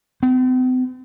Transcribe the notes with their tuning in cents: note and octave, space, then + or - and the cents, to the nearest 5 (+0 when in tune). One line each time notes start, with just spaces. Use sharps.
C4 -45